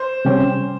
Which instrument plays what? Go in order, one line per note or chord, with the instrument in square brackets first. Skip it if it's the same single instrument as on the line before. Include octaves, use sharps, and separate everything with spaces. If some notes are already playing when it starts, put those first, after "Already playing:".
Already playing: [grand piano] C5
[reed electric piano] C3 G3 C#4 G4